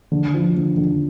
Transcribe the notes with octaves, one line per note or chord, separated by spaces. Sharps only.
D3
F3
D3
D3